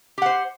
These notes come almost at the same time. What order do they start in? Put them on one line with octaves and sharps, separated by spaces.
G4 F#5 C5